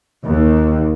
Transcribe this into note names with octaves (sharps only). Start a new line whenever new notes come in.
D#2